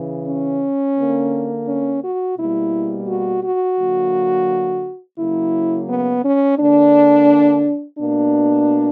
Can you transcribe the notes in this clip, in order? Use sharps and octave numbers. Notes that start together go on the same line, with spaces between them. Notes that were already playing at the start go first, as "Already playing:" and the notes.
Already playing: C#3 E3
C#4
D3 A#3
C#4
F#4
B2 G3 A#3 E4
F#4
F#4
D3 F#3 A#3
C#3 F#3 A#3 E4
B3
C#4
D3 A#3 D4
B2 A#3 D4